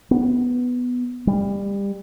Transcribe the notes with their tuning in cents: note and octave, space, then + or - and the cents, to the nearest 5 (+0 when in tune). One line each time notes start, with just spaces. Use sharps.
B3 +5
G3 +25